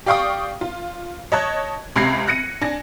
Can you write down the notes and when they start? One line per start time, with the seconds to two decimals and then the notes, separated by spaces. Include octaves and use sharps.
0.06 G4 D5 F5 G5 C#6 D#6
0.61 F4
1.32 C#5 D#5 A5 F#6 G#6
1.96 C#2 C3 B5 G#6 A#6 C7
2.27 F#6 A#6 C#7 D#7
2.61 D4 G#5 A#6